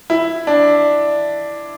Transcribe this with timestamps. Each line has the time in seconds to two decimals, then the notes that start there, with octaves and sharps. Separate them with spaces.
0.10 E4
0.47 D4